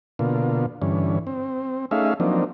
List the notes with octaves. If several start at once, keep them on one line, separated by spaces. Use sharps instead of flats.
B2 D3 A#3 F4
G2 D3 E3 C#4
C4
A3 C#4 D#4 G#4 E5 F5
F3 F#3 A#3 C4 D4 D#4